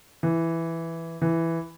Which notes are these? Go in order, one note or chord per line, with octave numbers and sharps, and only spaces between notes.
E3
E3